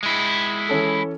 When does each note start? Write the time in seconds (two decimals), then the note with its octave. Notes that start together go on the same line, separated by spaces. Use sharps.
0.03 G#3 E4
0.69 E3 C#4 A4